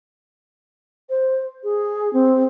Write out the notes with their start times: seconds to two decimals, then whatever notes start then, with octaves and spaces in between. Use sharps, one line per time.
1.10 C5
1.64 G#4
2.13 C4